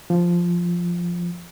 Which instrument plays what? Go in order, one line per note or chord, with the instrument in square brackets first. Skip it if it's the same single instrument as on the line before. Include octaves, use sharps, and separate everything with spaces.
[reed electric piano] F3